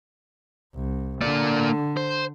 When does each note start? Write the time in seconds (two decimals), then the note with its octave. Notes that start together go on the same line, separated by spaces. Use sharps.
0.75 C2
1.21 D3 A#3 D5
1.97 C5